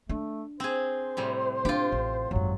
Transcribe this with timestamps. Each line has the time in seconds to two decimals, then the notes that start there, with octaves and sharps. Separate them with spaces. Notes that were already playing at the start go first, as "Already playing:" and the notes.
0.09 A3 D4
0.60 C4 G#4 C5
1.17 A2 C3 G3
1.65 D4 F4 G4
1.92 A1
2.31 G#1 F#2 F#3